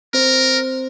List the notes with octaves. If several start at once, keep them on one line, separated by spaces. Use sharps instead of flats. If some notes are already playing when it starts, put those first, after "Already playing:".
C4 A#4 C5